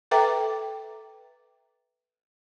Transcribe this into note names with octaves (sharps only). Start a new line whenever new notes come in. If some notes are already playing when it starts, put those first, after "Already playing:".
A4 B4 E5 G5 A#5 D6